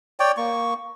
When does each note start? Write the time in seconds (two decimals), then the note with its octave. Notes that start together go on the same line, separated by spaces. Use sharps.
0.20 C#5 D5 G5
0.37 A#3 C#6